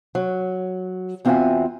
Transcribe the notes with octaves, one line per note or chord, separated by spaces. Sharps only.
F#3
E2 C4 F4 F#4 E5 G#5